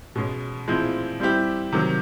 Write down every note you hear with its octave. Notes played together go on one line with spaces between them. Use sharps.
B2 G#3 C#4
A#2 F3 G#3 C4 E4
G3 C4 E4 G4
C3 D#3 F#3